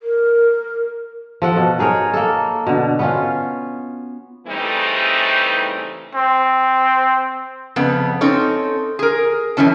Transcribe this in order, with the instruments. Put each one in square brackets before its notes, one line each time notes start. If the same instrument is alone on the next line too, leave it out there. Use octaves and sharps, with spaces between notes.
[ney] A#4
[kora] F3 A4 F#5
B2
D#4 G#4 A#4 C#5
A#3 A4
B2 D3
B3 C#4 F4
[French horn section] C#3 E3 G3 A3 C4 D#4
[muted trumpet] C4
[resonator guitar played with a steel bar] F2 C#3 B3
C4 C#4 D#4 A4 C#5
G#4 A#4
F2 A#2 E3 C#4 A5